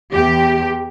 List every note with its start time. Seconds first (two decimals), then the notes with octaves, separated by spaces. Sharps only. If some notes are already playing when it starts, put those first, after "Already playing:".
0.12 E2 G4